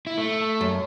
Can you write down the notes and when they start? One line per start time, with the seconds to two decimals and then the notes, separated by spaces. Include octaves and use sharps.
0.07 E4
0.18 A3
0.61 F#2